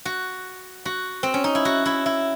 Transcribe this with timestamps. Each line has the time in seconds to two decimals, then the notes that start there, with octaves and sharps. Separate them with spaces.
0.05 F#4
0.85 F#4
1.23 C4
1.34 C#4
1.44 D#4
1.55 E4
1.65 F#4
1.86 E4
2.06 E4